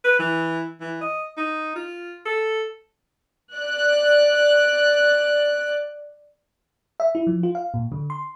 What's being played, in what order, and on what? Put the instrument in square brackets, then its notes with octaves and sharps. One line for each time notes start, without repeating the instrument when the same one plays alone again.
[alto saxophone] B4
E3
E3
D#5
D#4
F4
A4
[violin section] D5 F#6
[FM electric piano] E5
E4
F3
F4
F5
A#2
D3
C6